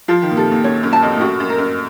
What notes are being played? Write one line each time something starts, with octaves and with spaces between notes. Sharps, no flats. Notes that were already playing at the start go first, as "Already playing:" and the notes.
F3 F4
D#3
A#2
C3 A4
A#2
F#2 C#5
F#2
A5
F2
A2
F#2 F#4
F#2
A#4
F#2